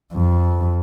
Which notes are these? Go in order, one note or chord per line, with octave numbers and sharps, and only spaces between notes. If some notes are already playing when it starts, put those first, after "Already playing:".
F2